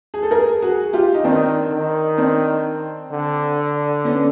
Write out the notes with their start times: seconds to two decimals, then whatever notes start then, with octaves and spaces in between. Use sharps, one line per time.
0.14 G#4
0.23 A4
0.31 G#4 A#4
0.62 F#4 G#4
0.93 F4 G4
1.14 D#4
1.24 D#3 C4 D4
1.71 D#3
2.17 C4 D4
3.11 D3
4.05 B3 C#4